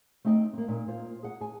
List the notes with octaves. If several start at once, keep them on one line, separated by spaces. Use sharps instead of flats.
A3 C4 D#4 D#5 G5
A#3 C4
A#2 D#4
F4 C5
G#4 F#5
G#4 G#5